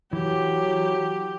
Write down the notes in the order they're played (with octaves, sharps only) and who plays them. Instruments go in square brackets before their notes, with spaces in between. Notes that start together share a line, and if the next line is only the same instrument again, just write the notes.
[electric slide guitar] E3 [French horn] F#3 [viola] G4